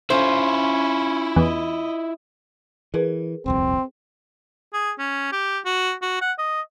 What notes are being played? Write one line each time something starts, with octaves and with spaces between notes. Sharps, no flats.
C#4 E4 F4 C5
E2 D#5
E3 G#4 A#4 B4
D#1 C2 F2 C4
G#4
C#4
G4
F#4
F#4
F#5
D#5